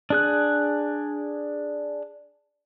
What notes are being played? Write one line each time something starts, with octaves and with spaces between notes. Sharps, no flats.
D4 G#4 F#6